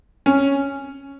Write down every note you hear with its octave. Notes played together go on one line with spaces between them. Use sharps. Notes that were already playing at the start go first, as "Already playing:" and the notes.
C#4